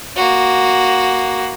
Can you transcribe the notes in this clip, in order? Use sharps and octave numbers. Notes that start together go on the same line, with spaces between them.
A#3 F#4